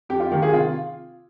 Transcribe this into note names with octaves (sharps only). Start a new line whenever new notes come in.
F2 G4
F4
D#3 A#3 G4
F4 G#4
C3 F4